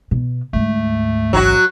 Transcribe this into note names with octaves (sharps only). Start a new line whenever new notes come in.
B2
D2 G#2 A3
A1 F#3 F#4